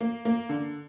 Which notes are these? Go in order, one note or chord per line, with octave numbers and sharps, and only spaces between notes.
A#3
A#3
D3